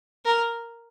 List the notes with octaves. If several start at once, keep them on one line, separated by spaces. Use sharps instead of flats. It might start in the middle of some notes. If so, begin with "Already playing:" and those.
A#4